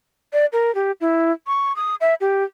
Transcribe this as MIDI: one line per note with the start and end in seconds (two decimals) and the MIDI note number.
0.33 0.46 74
0.52 0.74 70
0.75 0.91 67
1.01 1.32 64
1.47 1.75 85
1.76 1.95 87
2.01 2.14 76
2.21 2.44 67